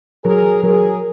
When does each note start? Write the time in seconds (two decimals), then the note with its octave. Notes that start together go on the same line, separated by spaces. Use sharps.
0.24 F#3 G#4 A#4
0.63 F#3 G#4 A#4